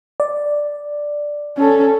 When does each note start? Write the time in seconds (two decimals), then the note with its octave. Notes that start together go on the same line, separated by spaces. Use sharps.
0.20 D5
1.58 C#4 A4